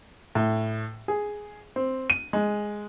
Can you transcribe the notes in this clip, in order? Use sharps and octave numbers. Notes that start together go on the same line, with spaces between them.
A2
G#4
C4
D#7
G#3